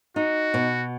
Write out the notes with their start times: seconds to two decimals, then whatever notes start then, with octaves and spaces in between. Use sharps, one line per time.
0.16 D#4 F#4
0.54 B2